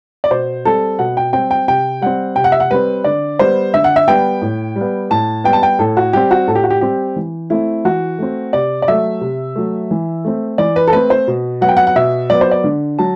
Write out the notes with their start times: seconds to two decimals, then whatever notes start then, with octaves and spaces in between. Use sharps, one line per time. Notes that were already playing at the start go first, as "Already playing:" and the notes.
0.24 D5
0.31 B2 C5
0.65 G3 C4 A4
0.99 B2 F#5
1.17 G5
1.33 G3 C4 G5
1.51 G5
1.68 C3 G5
2.01 G3 C4 F#5
2.36 C3 G5
2.44 F#5
2.52 E5
2.60 F#5
2.71 G3 C4 B4
3.04 D3 D5
3.39 G3 B3 C5
3.74 D3 E5
3.84 F#5
3.96 E5
4.08 G3 B3 G5
4.42 A2
4.76 G3
4.81 B3
5.10 A2 A5
5.44 G3 B3 G5
5.53 A5
5.63 G5
5.79 A2 A4
5.97 F#4
6.13 G3 C4 G4
6.31 F#4
6.47 A2 A4
6.55 G4
6.64 F#4
6.70 G4
6.81 G3 C4 G4
7.16 E3
7.50 A3 C4 E4
7.85 E3 F#4
8.19 A3 C4
8.53 C3 D5
8.82 D5
8.88 F#3 A3 E5
9.21 C3
9.56 F#3 A3
9.91 E3
10.25 A3 C4
10.58 E3 D5
10.76 B4
10.87 A4
10.93 A3 C4 B4
11.10 C5
11.28 B2
11.61 F#3 B3 F#5
11.69 G5
11.77 F#5
11.87 F#5
11.96 B2 E5
12.30 F#3 B3 D5
12.41 C5
12.51 D5
12.64 D3
12.99 F#3 A5